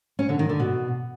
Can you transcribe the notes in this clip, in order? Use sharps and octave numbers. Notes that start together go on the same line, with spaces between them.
C#4
D3
D#3
D3
B2